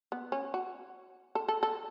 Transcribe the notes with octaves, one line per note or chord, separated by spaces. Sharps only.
B3
C#4
F#4
A4
A4
A4